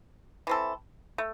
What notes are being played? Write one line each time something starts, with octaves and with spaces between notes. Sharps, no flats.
E3 C4 A4
A3